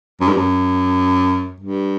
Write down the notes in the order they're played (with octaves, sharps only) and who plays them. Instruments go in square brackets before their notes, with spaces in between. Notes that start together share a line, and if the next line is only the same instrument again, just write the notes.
[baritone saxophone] F#2
G2
F#2
G2